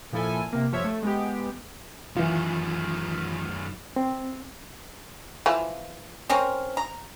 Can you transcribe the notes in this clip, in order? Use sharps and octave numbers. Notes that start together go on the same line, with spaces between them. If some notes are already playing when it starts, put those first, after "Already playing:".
A#2 F3 E4 A4 G#5
C3 A#3
G2 F3 C#5 E5 G#6
A3
G#3 B3 G4
F#2 D#3 E3 F4
C4
E3 F3 F4
C4 C#4 A#4
A#5